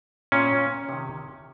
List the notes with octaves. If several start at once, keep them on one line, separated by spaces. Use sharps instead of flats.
A#2 C#4
C3 D#3